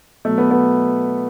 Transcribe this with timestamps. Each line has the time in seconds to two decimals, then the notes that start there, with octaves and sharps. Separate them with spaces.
0.25 B2 F#3 A3
0.38 B3
0.51 B3